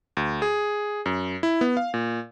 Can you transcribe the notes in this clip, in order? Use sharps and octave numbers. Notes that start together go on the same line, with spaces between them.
D2
G#4
F#2
E4
B3
F5
A#2